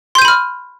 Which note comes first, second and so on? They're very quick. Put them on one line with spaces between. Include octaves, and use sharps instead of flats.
C6 G6 D#7 B5 F6